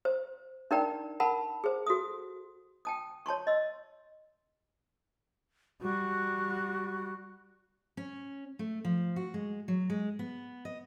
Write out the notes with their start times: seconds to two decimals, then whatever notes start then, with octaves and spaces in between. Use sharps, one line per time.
0.05 C5
0.71 D4 D#4 A#4 D5 G5 A#5
1.20 A#4 F#5 A5 B5
1.64 G#4 C5
1.86 F#4 A4 D#6
2.85 G5 A5 D#6
3.26 C#5 A5 C6 C#6
3.47 D#5 C6 E6
5.82 G3 F#4
7.97 C#4
8.59 A3
8.85 F3
9.16 F#4
9.34 G#3
9.68 F#3
9.90 G#3
10.19 B3
10.65 D#5